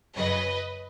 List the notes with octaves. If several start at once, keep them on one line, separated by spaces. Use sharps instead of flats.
F#2 C#3 F#3 B4 D#5